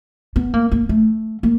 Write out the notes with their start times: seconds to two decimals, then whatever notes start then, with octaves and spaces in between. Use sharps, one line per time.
0.36 B3
0.54 A#3
0.72 A#3
0.89 A3
1.43 A#3